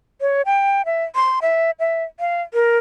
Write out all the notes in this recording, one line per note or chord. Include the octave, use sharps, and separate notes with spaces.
C#5
G5
E5
C6
E5
E5
F5
A#4